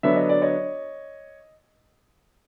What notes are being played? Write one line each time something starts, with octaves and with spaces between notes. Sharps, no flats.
D3 F#3 B3 D4 E5
D#5
D5
C#5 D#5